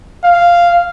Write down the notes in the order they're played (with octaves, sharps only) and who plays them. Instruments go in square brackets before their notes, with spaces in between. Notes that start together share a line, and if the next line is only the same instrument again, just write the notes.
[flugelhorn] F5